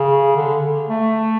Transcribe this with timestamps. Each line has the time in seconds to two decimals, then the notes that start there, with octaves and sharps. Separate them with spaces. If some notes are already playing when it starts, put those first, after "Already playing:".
Already playing: C#3
0.36 D3
0.89 A3